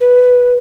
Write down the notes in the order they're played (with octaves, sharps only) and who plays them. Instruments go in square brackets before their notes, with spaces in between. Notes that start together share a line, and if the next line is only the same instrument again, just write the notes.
[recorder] B4